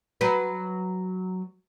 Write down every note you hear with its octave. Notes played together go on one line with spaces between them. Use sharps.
F#3 B4